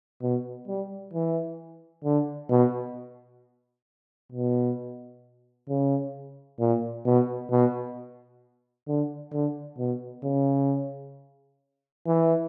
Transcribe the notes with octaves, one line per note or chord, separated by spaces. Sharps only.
B2
G3
E3
D3
B2
B2
C#3
A#2
B2
B2
D3
D3
B2
C#3
E3